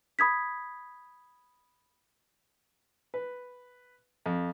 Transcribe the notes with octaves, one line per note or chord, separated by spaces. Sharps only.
B5 D#6 G#6 B6
B4
F2